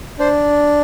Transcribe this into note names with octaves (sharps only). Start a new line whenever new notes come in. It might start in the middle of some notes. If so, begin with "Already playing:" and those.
D4 C5